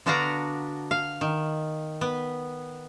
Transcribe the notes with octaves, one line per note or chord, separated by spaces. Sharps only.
D3 B3 D4 F#4 F5 A#5
F5
D#3
B3